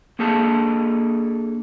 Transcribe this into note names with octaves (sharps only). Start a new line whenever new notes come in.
A#3 D4 G#4 A4 A5